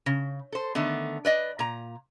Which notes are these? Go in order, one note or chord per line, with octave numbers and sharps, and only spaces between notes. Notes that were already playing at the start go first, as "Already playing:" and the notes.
C#3
A4 C5
D3 D#3 A3 B3
B4 D5 D#5
A#2 A#5